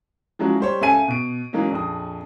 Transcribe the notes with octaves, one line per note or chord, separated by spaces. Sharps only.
F3 F#3 G#3 C#4 E4 F#4
G3 C5 C#5
C#2 A4 E5 G#5 D#7
B2 D7
E3 F#3 G#3 A#3 C#4 D#4
A#1 F2 D#6